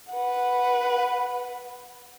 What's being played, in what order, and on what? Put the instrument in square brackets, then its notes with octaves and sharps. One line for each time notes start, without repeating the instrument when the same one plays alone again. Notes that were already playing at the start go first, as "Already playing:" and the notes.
[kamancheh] B4 F#5